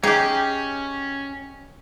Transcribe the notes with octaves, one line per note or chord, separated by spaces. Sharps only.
C#4 D#4 G4 G#4 G5